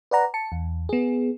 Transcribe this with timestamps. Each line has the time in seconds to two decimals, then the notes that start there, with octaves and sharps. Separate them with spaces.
0.11 B4 D5 F#5 A#5
0.34 A5 C#7
0.52 E2
0.89 B3 G#4